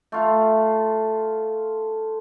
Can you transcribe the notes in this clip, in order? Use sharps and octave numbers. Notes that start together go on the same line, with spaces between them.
A3 F4